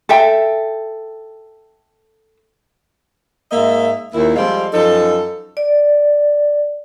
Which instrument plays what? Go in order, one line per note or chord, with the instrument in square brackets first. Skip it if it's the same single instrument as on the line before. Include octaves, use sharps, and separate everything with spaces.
[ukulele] A4 E5 G5
[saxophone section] G#2 A#3 D#5 E5
D#2 A#2 E4
F2 G3 G#3 A4 C5 F5
F#2 F3 D#4 A4
[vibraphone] D5